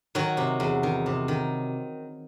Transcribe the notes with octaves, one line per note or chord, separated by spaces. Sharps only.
D#3 F#3 F#4
C3
E2
D#3
C3
D#3